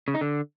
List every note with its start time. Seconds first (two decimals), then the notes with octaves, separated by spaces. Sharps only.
0.08 C#3
0.14 D#4
0.21 D3